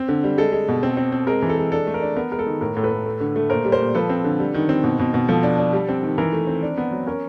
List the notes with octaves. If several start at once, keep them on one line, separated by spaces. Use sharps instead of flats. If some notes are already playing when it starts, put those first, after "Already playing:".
Already playing: C4
D3
G3
G#3 A4
G#3
B2
C4
C4
C4
G#3 A#4
E3
A4
G#3
D4 A4
A3
A#4
D4
B3 A#4
G#3 A#4
A4
D#3
A2 A#4
A2
A4 B4
A2
A3
D3
A3
A#2 A#4 C5
G3
A#4 C5
A#2
F3 A4 B4
C4
D3
G3
D#3
C4
B2
B2
B2
F3 A4
D4
D4
G3
C4
D#3
E3 A#4
A3
C4
D4
B3
F#3
C#4 A#4